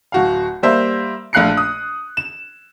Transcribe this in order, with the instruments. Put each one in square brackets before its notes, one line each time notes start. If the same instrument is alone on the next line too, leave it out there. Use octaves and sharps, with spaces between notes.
[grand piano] D1 F#4 F5
G3 A#3 C5 E5
A#1 A3 F5 F#6 C7 C#7
D#6
E7